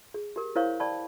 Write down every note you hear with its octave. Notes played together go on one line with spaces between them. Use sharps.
G#4
G4 A#4
E4 A#4 C5 C#5 F5 C#6
D5 G5 A5 B5 C#6